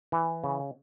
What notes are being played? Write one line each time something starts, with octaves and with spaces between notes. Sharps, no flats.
E3
C#3